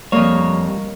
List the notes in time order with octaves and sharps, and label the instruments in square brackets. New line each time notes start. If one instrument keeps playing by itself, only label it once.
[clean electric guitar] F2 C#5 [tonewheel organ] G3 [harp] A#3 A#4 D#5